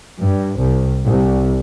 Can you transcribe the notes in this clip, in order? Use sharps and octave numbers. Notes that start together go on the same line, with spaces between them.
G2
C2
C2